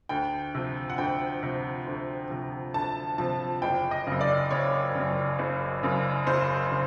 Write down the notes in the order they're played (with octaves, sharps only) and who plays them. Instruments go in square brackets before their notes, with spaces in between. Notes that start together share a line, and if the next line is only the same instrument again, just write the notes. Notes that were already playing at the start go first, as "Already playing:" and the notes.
[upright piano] D2 G5
C3 F3
F#5
D2 G5
C3 F3
D2
C3 F3
D2 A5
C3 F3 A5
F#1 G5
D#5
F#2 C#3
D5
F#1 C#5
F#2 C#3
F#1
F#2 C#3
F#1 C5
C#3